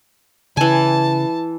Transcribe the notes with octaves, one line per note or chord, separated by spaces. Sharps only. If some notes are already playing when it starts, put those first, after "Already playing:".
C#3 E3 G#5 A5